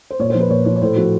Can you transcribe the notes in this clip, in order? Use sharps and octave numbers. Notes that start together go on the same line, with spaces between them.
C5
A#2 C#5
C5
F3
B4
A#2 C#5
F3 C#5
C#5
A2 C5
F3 F#4